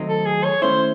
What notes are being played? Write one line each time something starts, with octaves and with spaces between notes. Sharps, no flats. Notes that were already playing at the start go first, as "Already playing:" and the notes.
Already playing: D#3 F#3 A3 C4 D#4
A4
G#4
C#5
D#3 A3 C#4 E4 C5